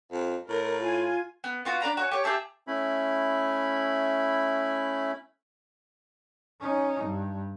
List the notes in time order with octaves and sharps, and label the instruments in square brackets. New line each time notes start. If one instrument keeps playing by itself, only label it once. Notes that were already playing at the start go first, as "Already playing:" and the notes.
[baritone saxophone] F2
[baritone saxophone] A2 [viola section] A#4
[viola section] F4 G#5
[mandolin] B3
B3 F4 F#4
D4 D5 A#5 B5
F#4 C#5 G#5
G4 C#5
G4 G#4 E5 A5
[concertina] A3 C#4 E4 B5
[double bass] C#4 D#4
G2